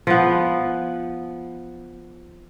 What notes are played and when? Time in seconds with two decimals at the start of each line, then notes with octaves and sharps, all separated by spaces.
0.07 F3 B3